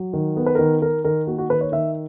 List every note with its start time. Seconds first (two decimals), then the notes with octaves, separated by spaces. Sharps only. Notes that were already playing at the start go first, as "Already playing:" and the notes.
Already playing: F#3
0.13 D#3
0.36 B3 A#4
0.46 B4
0.55 D#3 A#4
0.82 D#3 A#4
1.05 D#3 A#4
1.27 A#3 F#4
1.38 F#4
1.49 D#3 B4
1.61 C#5
1.72 D#3 E5